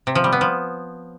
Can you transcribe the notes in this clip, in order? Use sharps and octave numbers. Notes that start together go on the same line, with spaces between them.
C3
F3
G3
B3
F3